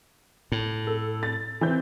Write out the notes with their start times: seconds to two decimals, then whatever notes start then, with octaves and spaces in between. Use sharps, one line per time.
0.52 A2
0.87 A4
1.23 A6
1.61 E3 C4 G6